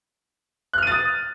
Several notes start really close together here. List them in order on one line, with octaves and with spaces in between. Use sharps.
F#6 F6 D#7 A6 D#6